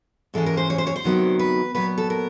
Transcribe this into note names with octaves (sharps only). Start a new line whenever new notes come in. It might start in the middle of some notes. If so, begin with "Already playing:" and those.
G#2 E3 G#3 C#4 A4
A#4
C5
C#5
C5
C#5
C5
D2 C3 D#3 F#3 B3
B4
A#2 F#3 B3 B4
A4
A#4